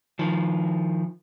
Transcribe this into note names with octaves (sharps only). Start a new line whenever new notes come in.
D#3 F3